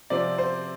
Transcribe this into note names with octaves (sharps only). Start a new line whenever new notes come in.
C3 F3 C4 D5
C5